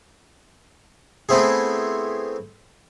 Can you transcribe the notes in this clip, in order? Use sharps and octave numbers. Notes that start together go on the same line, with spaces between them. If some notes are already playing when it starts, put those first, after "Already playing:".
A3 B3 C4 E4 G#4